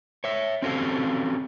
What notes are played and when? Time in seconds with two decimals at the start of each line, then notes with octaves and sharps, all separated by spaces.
0.24 C#5 E5
0.62 C4 C#4 F#4 G4 A4 F5